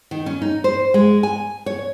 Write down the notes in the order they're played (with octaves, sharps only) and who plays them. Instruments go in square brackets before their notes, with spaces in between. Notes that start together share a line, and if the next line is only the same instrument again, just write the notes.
[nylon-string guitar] D#3
C#4
D#4
C5
G#3
G#5
C#5